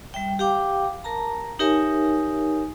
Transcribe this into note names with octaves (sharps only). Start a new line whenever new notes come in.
G3 E5 G5
G4 F5 G5 D6
A#4 A5 A#5
D#4 G4 A#4 C#5 E5 G#5